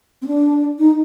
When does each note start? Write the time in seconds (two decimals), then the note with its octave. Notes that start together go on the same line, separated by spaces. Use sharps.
0.22 C4
0.27 D4
0.79 D#4